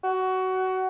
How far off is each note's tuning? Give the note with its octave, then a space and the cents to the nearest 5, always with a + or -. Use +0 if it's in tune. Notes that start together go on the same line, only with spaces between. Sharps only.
F#4 +20